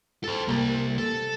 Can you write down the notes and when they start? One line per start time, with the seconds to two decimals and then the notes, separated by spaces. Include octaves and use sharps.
0.24 A4 C5
0.48 C3 G3 A#3
0.98 A4